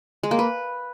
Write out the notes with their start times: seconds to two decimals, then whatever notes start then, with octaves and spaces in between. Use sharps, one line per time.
0.23 G#3
0.31 A#3
0.39 B4